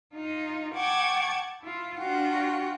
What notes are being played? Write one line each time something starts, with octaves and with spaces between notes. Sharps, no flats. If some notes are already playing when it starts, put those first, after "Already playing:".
D#4 F4
F#5 G5 A5 C#6 D6 G#6
E4 F4
D4 F4 F#4 F#5 G5